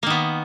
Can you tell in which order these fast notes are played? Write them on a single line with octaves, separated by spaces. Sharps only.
A#3 D#3 B3